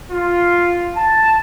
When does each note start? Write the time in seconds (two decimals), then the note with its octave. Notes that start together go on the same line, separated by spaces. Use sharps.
0.11 F4
0.96 A5